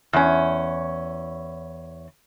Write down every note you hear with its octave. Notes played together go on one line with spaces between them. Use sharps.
E2 C#4